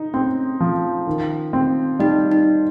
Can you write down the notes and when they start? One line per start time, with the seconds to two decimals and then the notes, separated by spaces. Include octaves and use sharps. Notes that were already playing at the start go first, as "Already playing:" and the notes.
Already playing: D#4
0.14 C4 C#4
0.60 F3
1.07 D#3
1.53 C4
1.99 G3 D#4
2.32 D#4